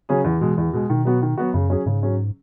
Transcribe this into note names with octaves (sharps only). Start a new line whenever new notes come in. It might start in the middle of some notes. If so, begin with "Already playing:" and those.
C#3 F#3 C#4 G#4
E2 E3
B2 G#3
E2
B2 G#3
B2 D#3
F#3 B3 F#4
D#3
F#3 B3 F#4
F#2 C#3
F#3 C#4 G#4
G#2 C#3
F#3 C#4 G#4